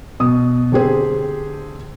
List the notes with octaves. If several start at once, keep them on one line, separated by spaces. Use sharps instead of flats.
B2 D#6
D3 C4 G4 G#4 C5